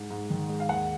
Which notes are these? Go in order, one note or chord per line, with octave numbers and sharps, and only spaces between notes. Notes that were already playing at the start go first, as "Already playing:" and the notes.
Already playing: G#2
G#2
D#3
G#3
F5
D#2 F#5